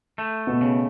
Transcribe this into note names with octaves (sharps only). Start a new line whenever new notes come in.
A3
B2 B3
C#3